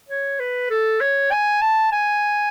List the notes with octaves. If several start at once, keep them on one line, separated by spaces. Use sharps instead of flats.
C#5
B4
A4
C#5
G#5
A5
G#5